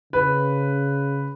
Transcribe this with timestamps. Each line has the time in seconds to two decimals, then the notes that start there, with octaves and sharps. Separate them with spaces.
0.13 C#3 B4